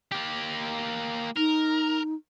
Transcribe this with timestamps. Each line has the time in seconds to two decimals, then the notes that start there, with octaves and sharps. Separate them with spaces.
0.12 A#3 G4
1.37 D#4 A#4